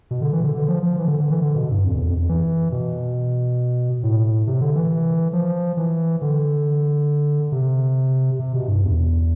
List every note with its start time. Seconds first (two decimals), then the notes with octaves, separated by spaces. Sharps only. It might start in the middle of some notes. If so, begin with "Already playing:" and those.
0.11 B2
0.21 D3
0.33 E3
0.44 D3
0.54 D3
0.68 F3
0.83 F3
0.98 E3
1.08 D3
1.20 D3
1.30 E3
1.42 D3
1.55 B2
1.71 G2
1.84 F2
1.95 E2
2.06 F2
2.18 F2
2.29 E3
2.72 B2
4.03 A2
4.47 C3
4.61 D3
4.76 E3
5.33 F3
5.77 E3
6.22 D3
7.52 C3
8.39 C3
8.54 B2
8.68 G2
8.83 E2